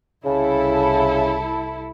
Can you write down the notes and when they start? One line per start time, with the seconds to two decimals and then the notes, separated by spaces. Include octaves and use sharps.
0.25 C2 C#3 E4 A4